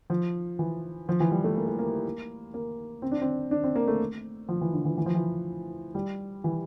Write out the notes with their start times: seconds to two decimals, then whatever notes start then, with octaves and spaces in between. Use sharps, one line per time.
0.10 F3
0.59 E3
1.09 F3
1.20 E3
1.31 G3
1.44 A3
1.57 A#3
1.68 A3
1.79 A#3
2.54 A#3
3.02 C4
3.11 D4
3.22 C4
3.51 D4
3.64 C4
3.75 A#3
3.88 A3
4.49 F3
4.61 E3
4.73 D3
4.85 E3
4.98 E3
5.06 F3
5.15 E3
5.95 G3
6.44 E3